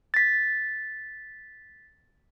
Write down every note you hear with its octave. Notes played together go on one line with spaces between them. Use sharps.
A6 B6